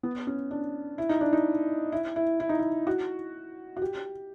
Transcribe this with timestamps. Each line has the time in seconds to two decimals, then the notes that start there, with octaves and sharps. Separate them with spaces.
0.03 B3
0.27 C#4
0.51 D4
0.98 E4
1.09 D#4
1.21 D4
1.33 D#4
1.92 E4
2.16 E4
2.40 E4
2.49 D#4
2.59 E4
2.87 F#4
3.77 F#4
3.82 G4